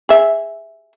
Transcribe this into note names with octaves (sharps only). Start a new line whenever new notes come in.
G#4 E5